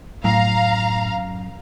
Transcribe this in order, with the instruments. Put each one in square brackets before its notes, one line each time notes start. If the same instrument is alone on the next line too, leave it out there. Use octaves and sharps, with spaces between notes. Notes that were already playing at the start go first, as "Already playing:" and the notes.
[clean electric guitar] F#2 [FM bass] A2 [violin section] F5 A#5